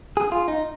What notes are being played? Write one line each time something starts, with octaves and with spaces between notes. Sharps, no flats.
G#4
F4
D#4